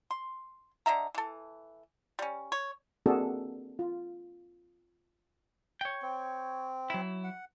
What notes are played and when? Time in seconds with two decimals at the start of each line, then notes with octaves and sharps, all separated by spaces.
0.11 C6
0.86 D3 D#5 E5 A#5
1.15 E3 A4
2.19 G3 C#4
2.52 C#5
3.06 A#3 C4 D4 F#4 G#4 A4
3.79 F4
5.81 C#5 G5
6.02 C4
6.90 F#3 E4
7.24 F#5